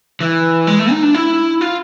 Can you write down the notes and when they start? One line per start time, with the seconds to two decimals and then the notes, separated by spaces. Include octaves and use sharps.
0.20 E3
0.67 G#3
0.79 A3
0.91 D#4
1.03 D4
1.15 E4
1.61 F4